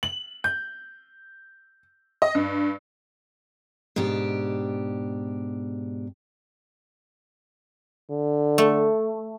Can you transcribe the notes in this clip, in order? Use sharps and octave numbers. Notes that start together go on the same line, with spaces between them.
F#7
G6
D#5
G2
G#2 B2 D4 G4
D3
A3